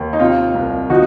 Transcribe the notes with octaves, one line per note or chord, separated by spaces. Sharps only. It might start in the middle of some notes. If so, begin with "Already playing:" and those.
Already playing: D#2
D#4
C3 F4
C2
F3 D#4 F#4